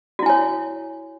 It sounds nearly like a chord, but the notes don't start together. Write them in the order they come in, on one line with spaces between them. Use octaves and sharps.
F#4 E4 G#5 C#5